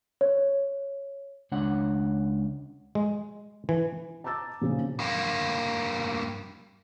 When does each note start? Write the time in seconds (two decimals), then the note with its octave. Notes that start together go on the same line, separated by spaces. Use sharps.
0.21 C#5
1.52 C#2 D4 C#5 F#5
2.95 G#3
3.69 E3
4.24 A5 A#5 D6 E6 A6
4.62 A#2 C#3 F3 A#3
5.00 G2 A#3